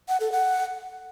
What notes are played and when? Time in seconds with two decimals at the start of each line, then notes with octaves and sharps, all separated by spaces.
0.08 F#5
0.20 A4
0.32 F#5